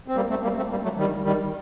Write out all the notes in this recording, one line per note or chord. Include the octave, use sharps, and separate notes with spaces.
C4
G3 A#3
A3 C4
G3 A#3
A3 C4
G3 A#3
F#3 A3
D#3 G3
D#3 G3